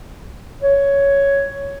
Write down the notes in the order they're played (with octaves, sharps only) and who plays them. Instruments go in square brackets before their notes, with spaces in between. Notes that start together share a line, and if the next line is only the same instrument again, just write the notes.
[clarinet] C#5